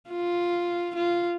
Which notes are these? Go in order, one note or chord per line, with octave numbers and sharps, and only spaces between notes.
F4
F4